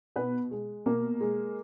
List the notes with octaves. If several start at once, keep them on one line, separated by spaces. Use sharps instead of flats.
B2 B3 B4
G#3
B2 A#3 A#4
G#3